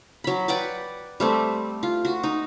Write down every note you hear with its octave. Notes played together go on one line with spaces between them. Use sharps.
F#3 B5
B4 D5 F#5 G5
G3 A3 C4
F4
F#4
D#4